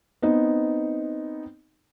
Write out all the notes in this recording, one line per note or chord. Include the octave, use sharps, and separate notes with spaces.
B3 C4 D#4